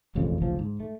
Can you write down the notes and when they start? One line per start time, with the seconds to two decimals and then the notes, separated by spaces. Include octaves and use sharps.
0.15 E1 A1 F2 C#3
0.42 A1 D2 C#3 F3
0.59 G#2
0.80 A3